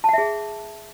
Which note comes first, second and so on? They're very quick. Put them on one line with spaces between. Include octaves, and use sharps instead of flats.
A5 F#5 E5 G#4